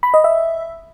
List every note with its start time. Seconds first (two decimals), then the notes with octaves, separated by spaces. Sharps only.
0.03 B5
0.14 D#5
0.24 E5